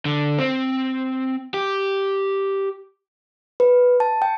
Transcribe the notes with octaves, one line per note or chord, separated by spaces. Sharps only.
D3
C4
G4
B4
A5
G5